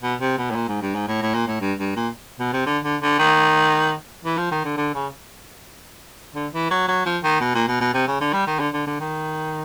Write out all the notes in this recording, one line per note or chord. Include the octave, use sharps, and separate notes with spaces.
B2
C3
B2
A2
A#2
G#2
G2
G#2
A2
A2
A#2
A2
G2
G2
A#2
B2
C3
D3
D3
D3
D#3
E3
F3
D#3
D3
D3
C#3
D3
E3
F#3
F#3
F3
D#3
B2
A#2
B2
B2
C3
C#3
D3
G3
D#3
D3
D3
D3
D#3